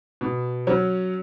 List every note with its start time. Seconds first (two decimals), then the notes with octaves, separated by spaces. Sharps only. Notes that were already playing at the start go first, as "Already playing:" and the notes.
0.21 B2
0.67 F#3 C#4